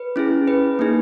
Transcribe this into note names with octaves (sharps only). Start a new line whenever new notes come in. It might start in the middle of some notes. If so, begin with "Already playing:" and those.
Already playing: B4
C#4 E4 G#4
B4
A#3 D#4 G#4